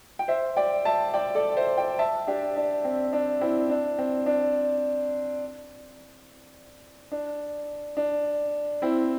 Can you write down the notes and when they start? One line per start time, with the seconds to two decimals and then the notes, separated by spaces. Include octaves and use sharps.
0.19 G5
0.28 C5 E5
0.57 D5 G5
0.85 E5 A5
1.14 D5 G5
1.35 A4 D5
1.57 C5 E5
1.77 D5 G5
1.99 E5 A5
2.27 D4 G4
2.56 D4
2.85 C4
3.13 D4
3.41 C4 E4
3.69 D4
3.98 C4
4.26 D4
7.12 D4
7.97 D4
8.82 C4 E4